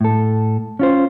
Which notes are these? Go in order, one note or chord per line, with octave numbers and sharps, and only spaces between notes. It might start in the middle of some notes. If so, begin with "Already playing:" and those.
A2 A4
C#4 F4 C5